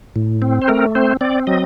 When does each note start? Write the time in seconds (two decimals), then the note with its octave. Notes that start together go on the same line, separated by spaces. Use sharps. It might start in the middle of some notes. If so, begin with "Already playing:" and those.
0.16 A2
0.42 C4
0.62 C5
0.68 A3 A#4
0.95 C4 C5
1.21 C4 D5
1.47 F#3 D#5